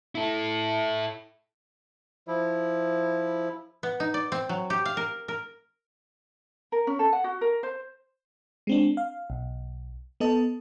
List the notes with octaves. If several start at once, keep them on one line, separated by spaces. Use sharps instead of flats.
E4 A4
F3 E4
B3
D#4
D5
C4
F#3
G4
F5
A#4
A#4
A#4
C#4
A4
F#5
F#4
A#4
C5
G#3 C4 D4
F5
B1
B3 A4 D#5 A5